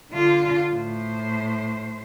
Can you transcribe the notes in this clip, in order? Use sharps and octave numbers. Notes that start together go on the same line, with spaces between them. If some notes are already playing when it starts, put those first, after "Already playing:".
D3 F4
A2 C5